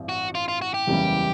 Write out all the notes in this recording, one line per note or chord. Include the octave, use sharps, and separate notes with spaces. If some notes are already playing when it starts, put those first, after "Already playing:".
Already playing: A1 G2 C4
F#4
F4
F4
F#4
G4
F#1 E2 C#3 E3 G3